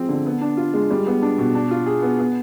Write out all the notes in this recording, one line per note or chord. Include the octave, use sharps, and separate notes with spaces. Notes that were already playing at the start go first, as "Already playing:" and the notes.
Already playing: F3 G#3 C4
D3
B3
D4
F4
G#3
G3
B3
D4
B2
D4
F4
G#4
B3
B3